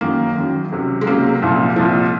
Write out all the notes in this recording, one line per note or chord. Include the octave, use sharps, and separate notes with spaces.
F#2 D#3 F#3 A#3
F#2 D#3 F#3
C#2 C3 F#3
G#3
C#2 C3 F#3 A#3
C2 A#2 F3
C2 A#2 F3